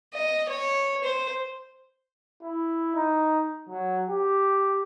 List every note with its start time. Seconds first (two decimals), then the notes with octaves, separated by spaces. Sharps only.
0.14 D#5
0.49 C#5
1.04 C5
2.43 E4
2.95 D#4
3.69 F#3
4.09 G4